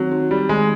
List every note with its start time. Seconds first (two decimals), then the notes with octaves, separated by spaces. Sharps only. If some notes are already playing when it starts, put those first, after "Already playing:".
Already playing: D#3 F#3 C4 D#4
0.12 D#4
0.30 G3 D#4
0.49 D#3 G#3